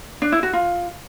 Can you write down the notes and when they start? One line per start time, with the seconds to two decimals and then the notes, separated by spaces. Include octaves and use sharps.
0.22 D4
0.32 E4
0.43 F#4
0.53 F4